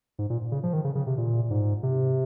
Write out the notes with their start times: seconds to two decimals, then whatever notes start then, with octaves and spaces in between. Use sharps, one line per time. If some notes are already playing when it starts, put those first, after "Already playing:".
0.19 G#2
0.30 A#2
0.52 C#3
0.63 F3
0.73 D#3
0.84 C#3
0.95 C#3
1.07 C3
1.18 A#2
1.50 G#2
1.83 C3